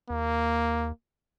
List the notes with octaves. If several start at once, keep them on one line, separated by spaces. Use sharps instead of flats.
D#2 A#3